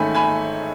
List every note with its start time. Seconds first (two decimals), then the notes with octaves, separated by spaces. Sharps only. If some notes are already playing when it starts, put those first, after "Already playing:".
Already playing: A1 G#2 D#3 A3 C#4 E5 G#5 B5
0.15 G#5 B5